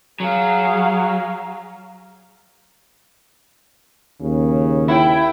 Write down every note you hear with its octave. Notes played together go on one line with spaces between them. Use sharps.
F#3 G#4 F5
D#2 C#3
E4 G5